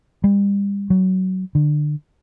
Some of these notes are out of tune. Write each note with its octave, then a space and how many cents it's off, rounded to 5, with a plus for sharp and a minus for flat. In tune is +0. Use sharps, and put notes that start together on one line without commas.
G3 +35
F#3 +15
D3 +25